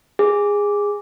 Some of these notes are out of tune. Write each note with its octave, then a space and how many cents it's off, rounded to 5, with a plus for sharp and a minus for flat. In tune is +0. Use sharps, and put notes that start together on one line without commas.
G#4 -15